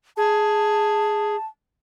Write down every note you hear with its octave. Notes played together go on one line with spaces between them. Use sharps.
G#4 A5